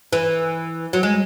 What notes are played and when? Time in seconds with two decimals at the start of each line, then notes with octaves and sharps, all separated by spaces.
0.13 E3
0.93 F#3
1.03 G#3